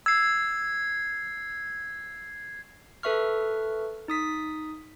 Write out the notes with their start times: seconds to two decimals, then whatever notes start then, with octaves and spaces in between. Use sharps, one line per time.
0.06 E6 G#6 C7
3.03 A4 B4 E5 C#6 F6
4.08 D#4 D#6 B6